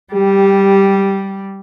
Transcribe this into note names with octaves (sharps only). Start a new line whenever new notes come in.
G3 G4